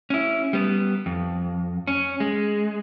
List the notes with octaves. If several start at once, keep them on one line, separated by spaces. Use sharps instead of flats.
C#4 E4
G3 B3
F2
C#4
G#3